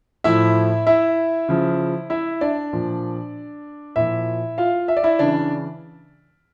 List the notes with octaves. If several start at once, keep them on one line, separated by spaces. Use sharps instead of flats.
A2 F3 E4 E5
E4 E5
C#3 F3
E4 E5
D4 D5
A#2 F3
A#2 F3 E4 E5
F4 F5
E5
D5
E4 E5
C#3 E3 D4 D5